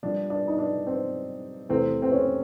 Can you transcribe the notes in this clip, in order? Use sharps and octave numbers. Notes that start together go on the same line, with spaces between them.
A#2 G3 A#3 D4
D4
D#4
D4
C4
E2 C3 E3 A3 C4
C4
C#4